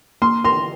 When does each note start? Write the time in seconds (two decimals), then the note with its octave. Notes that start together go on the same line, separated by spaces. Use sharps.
0.22 A#3 C6
0.44 A#4 C6